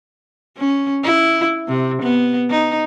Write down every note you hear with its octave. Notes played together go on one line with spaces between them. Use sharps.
C#4
E4
C3
B3
D#4